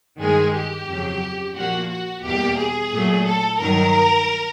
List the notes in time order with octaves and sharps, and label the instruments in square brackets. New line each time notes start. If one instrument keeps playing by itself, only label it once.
[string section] G2 D#3 G#3 G#4
G4
F2 C#3 F#3
A#2 F3 A#3 F#4
F#4
E2 B2 G3 A#3 G4
G#4
A#2 F#3 A3
A4
G2 D#3 F#3 A#4